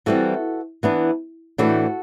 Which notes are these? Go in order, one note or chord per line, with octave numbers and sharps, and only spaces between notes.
E3 G3 C4 F#4 A4
E3 B3 D4
A2 E3 A3 D4 F#4 A4